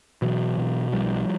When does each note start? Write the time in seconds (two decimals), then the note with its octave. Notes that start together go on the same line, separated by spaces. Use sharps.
0.22 B2 E3 F#3
0.58 B2
0.92 B1 F3 G3